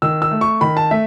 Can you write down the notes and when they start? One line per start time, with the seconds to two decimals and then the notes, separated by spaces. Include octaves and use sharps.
0.02 D#3 E6
0.22 E6
0.31 A3
0.41 C#6
0.61 D#3 B5
0.77 A5
0.91 A3 E5